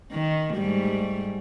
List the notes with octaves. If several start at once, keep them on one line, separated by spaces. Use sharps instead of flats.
D#3
G#2 G3 A3